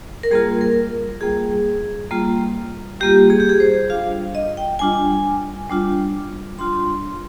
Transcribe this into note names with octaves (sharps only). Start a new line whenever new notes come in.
A#4
G3 A#3 F4 G#4
A#4
G3 A#3 F4 G#4
G3 A#3 F4
G3 A#3 F4 G4
G#4
G4
G#4
C5
G3 D4 F4 F5
D#5
G5
G3 D4 F4 G#5
G3 D4 F4
G3 D4 F4 C6